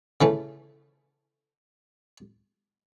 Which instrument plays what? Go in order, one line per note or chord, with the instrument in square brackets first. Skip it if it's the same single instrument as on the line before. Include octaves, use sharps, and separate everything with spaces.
[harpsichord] C#3 E3 A3